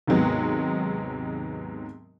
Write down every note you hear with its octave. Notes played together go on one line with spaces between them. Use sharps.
D#2 G#2 C3 F#3 G#3 B3